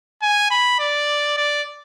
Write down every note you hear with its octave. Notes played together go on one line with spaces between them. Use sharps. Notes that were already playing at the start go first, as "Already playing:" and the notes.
G#5
B5
D5
D5